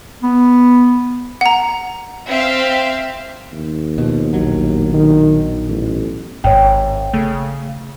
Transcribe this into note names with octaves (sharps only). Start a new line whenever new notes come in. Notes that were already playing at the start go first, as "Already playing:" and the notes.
B3
F#5 A#5
C4 E5 F5
D#2
B2 F3
A#1 B2 F#3
D#3
A1
G#1 G#2 C#5 G5
C#3 A3